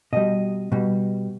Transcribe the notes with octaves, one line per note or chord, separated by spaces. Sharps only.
B2 G3 D#5
B2 G3